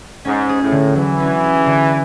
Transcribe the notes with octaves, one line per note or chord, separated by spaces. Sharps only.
G#2 C#4
G#4
A2
D3
E3 F#3
C#4
G#4
D3